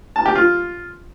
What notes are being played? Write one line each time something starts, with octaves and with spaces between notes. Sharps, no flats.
A5
G4
F4